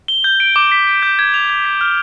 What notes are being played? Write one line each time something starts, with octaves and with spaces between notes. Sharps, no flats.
G7
G6
D7
D6
B6
D7
G6
G#6
F7
G#6
B6
F6